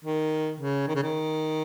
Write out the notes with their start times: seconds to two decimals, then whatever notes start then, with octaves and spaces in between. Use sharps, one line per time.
0.05 D#3
0.60 C#3
0.88 D#3
0.95 C#3
1.03 D#3